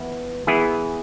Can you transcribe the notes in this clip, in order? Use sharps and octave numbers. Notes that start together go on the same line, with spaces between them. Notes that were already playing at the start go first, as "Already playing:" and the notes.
Already playing: E3 B3 E4
E3 B3 E4 G#4